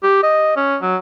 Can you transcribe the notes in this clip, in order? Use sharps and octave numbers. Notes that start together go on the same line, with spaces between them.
G4
D#5
C#4
F#3